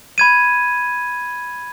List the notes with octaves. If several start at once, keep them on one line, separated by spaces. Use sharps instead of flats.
B5 G#6 D#7